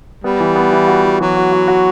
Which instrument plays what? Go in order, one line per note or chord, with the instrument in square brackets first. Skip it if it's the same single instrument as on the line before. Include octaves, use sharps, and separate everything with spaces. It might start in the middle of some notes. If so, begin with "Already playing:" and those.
[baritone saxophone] G3 [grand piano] B3
[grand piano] E3
B3
E3
F#4
E3
[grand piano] E3 [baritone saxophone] F#3
[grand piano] F#4
F#4
F#4